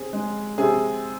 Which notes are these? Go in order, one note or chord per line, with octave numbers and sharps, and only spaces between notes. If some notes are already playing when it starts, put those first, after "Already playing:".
Already playing: C4 G#4
G#3
C3 G#4